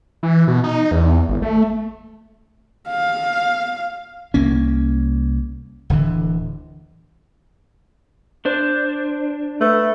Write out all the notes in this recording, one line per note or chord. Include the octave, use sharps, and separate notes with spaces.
E3
B2
D#4
E2
G#1
A3
F5
C2 A#3 C#4
D1 D3 E3
D4 C5
A3 B4